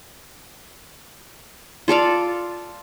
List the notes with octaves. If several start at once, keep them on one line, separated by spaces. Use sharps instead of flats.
F4 A4 D5 F5